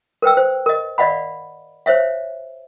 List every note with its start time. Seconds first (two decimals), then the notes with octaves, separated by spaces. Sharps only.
0.22 A#4 B4 G5 E6
0.37 C5
0.66 A#4 D#5
0.98 D5 D#5 F5 F#5 B5
1.86 C5 C#5 E5 F5